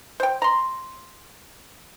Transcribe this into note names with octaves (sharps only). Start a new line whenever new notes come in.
C5 G5
A#5 C6